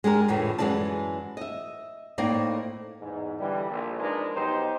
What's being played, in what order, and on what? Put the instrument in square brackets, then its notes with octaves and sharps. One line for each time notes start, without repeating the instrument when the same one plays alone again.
[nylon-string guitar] G#3 D4 G4 A#4
F2 A2 D3 E3 A3
F#2 E3 G#3 E4 D5 A5
D#5 E5
A2 A#3 C4 D#4 D5 D#5
[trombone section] E2 G#2
D3 E3 G3
A#1
F3 G#3 D4 D#4 A#4 B4
B2 F#3 D#4 G4 C5